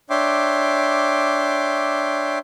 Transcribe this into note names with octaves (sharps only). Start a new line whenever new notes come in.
D4 C#5 E5 G5 C6 D6